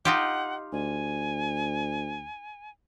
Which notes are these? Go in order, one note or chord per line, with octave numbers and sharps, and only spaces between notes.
D#4 F4 G4 F#5
D2 G#5